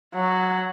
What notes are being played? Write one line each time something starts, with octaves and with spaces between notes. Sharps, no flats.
F#3